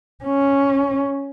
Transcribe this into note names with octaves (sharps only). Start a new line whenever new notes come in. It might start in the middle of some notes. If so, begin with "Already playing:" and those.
C#4